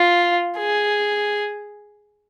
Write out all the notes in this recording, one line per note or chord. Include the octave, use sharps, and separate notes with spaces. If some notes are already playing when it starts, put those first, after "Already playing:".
Already playing: F4
G#4